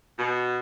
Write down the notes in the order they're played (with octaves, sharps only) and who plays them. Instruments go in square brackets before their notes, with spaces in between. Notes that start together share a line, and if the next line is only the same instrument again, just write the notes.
[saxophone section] B2